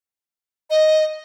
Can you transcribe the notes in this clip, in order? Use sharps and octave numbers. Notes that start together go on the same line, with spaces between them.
D#5